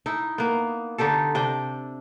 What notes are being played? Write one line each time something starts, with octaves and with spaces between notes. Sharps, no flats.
D#4 E4
A#3 B3
D3 D#4 G4 A4
C3 D4 G5